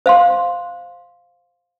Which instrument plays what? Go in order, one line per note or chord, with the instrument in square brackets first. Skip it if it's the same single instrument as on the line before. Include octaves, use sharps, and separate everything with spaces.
[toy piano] C5 F5 C6